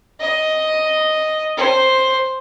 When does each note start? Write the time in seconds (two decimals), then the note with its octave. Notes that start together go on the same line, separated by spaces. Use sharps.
0.20 D#5
1.57 C5